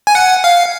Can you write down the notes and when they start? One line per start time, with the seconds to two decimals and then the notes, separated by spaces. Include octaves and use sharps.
0.07 G#5
0.15 F#5
0.44 F5